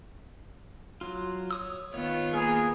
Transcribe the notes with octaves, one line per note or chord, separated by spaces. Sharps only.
F#3 F4
C#5 D#6 E6
D#3 B3 F4 C#5
A#3 G#4 A#4